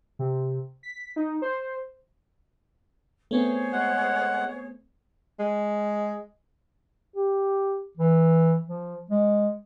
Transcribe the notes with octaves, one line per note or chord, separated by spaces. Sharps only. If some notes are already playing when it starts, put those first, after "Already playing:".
C3
B6
D#4
C5
A3 B3 C4 G#4 C5 C#5
G#3 F#5
G#3
G4
E3
F3
G#3